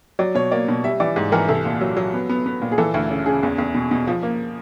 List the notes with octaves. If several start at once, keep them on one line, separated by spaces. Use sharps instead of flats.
F#3 D5
B2 C#5
A#3 D5
B2
G3 E5
E3 D5
G#2
E3 A#4
C2 A4
A#2
F#3
F#3
B3
B3
B3
A#2
G#4
E3 A4
D2
C#3
C#3 G#4
E2
E2
B2
B2
F3
A#3